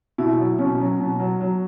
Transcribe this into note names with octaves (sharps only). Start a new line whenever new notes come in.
B2 E4
F#3
B2 C#4
F#3
B2
F#3
F#3